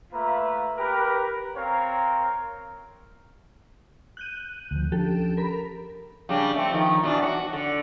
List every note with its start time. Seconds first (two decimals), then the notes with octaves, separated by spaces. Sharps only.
0.13 A3 A#3 F4 B4 E5 A#5
0.78 G4 A#4 B4
1.56 C4 A#4 C5 C#5 F5 A#5
4.17 F#6 G6 D#7
4.71 D2 F3
4.92 F3 C#4 D4 G4 A4
5.37 A#4 B5
6.29 C#3 G3 D4
6.55 A3 C4
6.71 D#3 F3
7.03 B2 E3 D4
7.23 C#4 F#4
7.53 D3